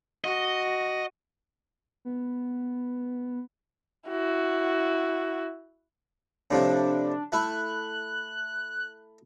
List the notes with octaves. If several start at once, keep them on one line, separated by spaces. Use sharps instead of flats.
F#4 D#5
B3
E4 F#4
A2 C3 F3 D4
A3 E4 F#6